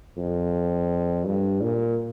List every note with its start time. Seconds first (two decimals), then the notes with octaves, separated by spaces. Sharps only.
0.17 F2
1.25 G2
1.61 A#2